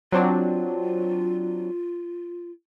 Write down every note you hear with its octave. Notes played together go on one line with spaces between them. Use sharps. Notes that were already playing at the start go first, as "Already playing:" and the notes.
F#3 C4 D4 F4